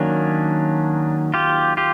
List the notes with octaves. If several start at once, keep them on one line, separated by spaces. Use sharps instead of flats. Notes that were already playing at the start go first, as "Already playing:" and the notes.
Already playing: D#3 F#3 A#3 C#4 D4
F4 G4
F4 G4